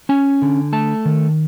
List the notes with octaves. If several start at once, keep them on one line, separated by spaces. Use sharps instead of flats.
C#4 G#5
D3
A3 A5
D#3